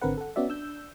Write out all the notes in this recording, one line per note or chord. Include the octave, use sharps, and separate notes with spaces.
G#1 D3 C4 A#4 B4 F#5
A4 F#5
B3 C#4 F#4 D5 E5
D4 E6 G6